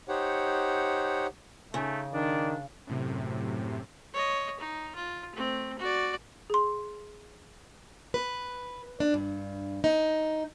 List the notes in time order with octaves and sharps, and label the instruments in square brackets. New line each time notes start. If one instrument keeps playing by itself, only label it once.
[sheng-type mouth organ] D#4 G4 C5 C#5 F#5
[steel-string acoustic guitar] C#3 [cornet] A3 [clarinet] D#4
[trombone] D#3 [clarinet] D4 [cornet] D5
[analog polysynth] F#2 A2 C3
[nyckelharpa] C#5 D#5
D#4
F4
A3 C4
F#4 D5
[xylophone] G#4 C6
[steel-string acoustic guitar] B4
D4
G2
D#4